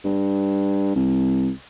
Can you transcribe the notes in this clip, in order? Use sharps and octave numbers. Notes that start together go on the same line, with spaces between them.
G2
C2